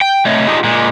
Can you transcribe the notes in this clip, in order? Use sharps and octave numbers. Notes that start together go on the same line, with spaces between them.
G5
C3 A3 C#5 D#5
D4 D#4 F4 G4 G#4 D#5
A#2 G#3